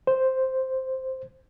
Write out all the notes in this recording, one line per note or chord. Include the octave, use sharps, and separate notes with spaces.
C5